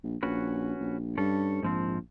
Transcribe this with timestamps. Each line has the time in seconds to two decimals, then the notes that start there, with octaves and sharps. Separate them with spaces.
0.03 A#1
0.23 A#1 C#4 F#4 B4
0.80 A#1
1.18 G2 C#4 A4
1.63 A#1 G#2 F3 C4